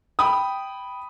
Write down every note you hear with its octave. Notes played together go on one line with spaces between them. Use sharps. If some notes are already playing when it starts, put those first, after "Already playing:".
G5 B5 D#6